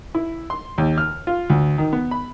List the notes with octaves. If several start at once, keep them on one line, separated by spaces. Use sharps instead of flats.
E4
C6
D#2
F6
F4
D2
D#3
B3
B5